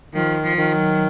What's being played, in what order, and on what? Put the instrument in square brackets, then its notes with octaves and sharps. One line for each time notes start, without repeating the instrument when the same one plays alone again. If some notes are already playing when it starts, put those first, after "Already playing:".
[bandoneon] D#3 [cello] F3
[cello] F3
[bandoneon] D#3
[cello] F#3